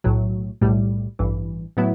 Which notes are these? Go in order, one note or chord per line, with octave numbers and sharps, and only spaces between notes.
B1 A2 F#3
B1 A2 G3
A1 G2 E3
A2 F#3 B3 E4